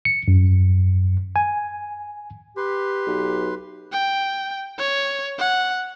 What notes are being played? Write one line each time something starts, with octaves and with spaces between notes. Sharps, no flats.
C#7
F#2
G#5
G4 B4 C6
B1
G5
C#5
F#5